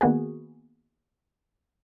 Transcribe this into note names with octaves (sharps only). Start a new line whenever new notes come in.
D#3 A#3 B3 F#4 G#4